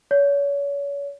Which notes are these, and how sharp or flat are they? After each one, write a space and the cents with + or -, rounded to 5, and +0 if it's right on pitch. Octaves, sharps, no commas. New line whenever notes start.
C#5 +35